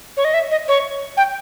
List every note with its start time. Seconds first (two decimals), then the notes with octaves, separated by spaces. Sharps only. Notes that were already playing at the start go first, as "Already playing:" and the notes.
0.17 C#5
0.25 D#5
0.34 E5
0.51 D#5
0.68 C#5
1.17 G5